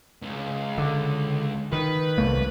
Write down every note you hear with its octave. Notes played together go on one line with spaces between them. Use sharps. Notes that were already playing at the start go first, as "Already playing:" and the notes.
C#2
D3
D#3 B4
C2 A3 A#3